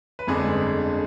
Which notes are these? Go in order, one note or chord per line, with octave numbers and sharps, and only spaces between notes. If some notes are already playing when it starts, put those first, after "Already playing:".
B4
G1 F2 D3 G#3 D4 G#4